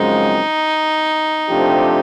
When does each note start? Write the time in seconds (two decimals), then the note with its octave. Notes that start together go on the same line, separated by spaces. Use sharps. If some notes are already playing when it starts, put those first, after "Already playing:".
Already playing: F#2 C#3 F3 G#3 C4 D#4
1.49 C3 F3 A3 D4 G4